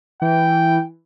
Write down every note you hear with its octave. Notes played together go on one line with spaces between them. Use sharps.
E3 G5